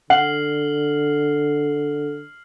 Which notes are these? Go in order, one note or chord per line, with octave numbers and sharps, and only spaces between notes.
D3 F#5 F6 C7 F#7